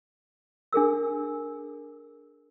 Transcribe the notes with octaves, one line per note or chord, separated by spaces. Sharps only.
D4 G#4 A#4 E6